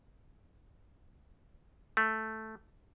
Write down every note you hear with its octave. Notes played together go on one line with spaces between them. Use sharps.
A3